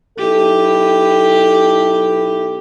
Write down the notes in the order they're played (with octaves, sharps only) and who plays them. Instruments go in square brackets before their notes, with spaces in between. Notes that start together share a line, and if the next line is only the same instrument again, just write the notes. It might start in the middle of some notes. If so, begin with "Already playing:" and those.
[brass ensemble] B1 E4 A4 [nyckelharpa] G4